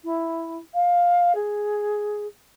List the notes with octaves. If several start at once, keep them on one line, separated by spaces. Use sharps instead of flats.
E4
F5
G#4